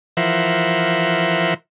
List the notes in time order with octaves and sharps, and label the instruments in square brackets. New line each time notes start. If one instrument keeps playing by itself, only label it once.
[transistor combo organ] E3 F3 A#4 C5 E5 F#5